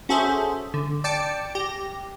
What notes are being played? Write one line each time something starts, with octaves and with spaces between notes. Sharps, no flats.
C#4 F#4 G#4 A4 C5 E5
D3
D5 G5 A5 D6 C#7
G4 A#6